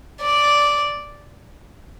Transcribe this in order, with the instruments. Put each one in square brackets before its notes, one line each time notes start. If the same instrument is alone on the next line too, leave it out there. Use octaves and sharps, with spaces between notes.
[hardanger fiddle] D5